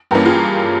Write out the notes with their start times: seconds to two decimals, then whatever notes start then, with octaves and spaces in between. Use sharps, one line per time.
0.11 G2 E3 A#3 C#4 G4 A#4
0.26 F4 G#4